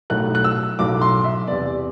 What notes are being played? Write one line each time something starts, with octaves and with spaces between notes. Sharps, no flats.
B1 A2 F#3 A3 F#6
F#6
E6
B1 A2 F#3 A3 D6
C6
E5
E2 C3 G3 B3 D5